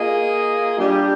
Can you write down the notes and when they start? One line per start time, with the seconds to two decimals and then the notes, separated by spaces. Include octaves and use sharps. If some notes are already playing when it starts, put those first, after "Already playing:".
Already playing: A#3 F4 G#4 D#5
0.78 G3 D4 G4